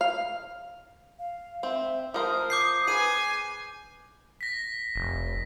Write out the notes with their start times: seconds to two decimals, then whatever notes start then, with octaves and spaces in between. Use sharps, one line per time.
0.01 F5
1.19 F5
1.63 C4 E5
2.14 F3 A#4 C5 D#6
2.50 D6 G6 C7
2.87 G#4 B4 G#5 C7 D#7
4.41 A#6 B6
4.96 F1